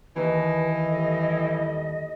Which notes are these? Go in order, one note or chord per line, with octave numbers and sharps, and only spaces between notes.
D#2 E3 B4 D#5
A2 G3 A4